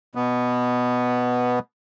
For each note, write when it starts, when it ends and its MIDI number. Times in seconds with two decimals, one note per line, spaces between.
0.15 1.59 47
0.15 1.59 59